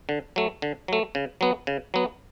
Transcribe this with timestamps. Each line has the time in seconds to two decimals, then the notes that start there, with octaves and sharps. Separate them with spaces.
0.09 D3
0.36 F#3 A3
0.62 D3
0.88 F#3 A3
1.15 C#3
1.41 F#3 B3
1.67 C#3
1.94 F#3 B3